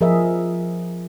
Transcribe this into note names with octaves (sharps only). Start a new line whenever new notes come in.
F3 G#4 A#4 D#5 E5